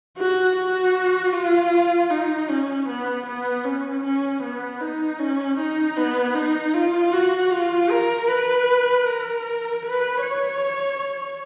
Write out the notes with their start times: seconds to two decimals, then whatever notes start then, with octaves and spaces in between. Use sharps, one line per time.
0.18 F#4
0.56 F#4
1.33 F4
2.11 D#4
2.49 C#4
2.88 B3
3.26 B3
3.64 C#4
4.04 C#4
4.43 B3
4.81 D#4
5.20 C#4
5.58 D#4
5.97 B3
6.35 D#4
6.74 F4
7.13 F#4
7.51 F4
7.90 A#4
8.28 B4
9.06 A#4
9.83 B4
10.22 C#5